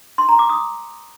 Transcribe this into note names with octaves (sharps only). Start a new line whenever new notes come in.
C6
A#5
D6
D#6